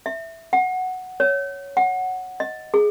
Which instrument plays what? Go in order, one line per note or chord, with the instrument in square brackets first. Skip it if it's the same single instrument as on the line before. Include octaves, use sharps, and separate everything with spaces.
[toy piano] E5
F#5
C#5
F#5
D#5
G#4